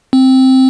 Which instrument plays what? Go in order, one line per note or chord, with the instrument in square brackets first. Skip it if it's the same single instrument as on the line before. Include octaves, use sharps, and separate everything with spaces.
[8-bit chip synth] C4